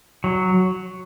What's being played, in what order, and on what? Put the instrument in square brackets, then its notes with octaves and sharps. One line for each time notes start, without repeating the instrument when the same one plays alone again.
[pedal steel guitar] F#3